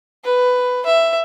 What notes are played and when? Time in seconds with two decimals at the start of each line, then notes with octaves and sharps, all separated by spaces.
0.24 B4
0.86 E5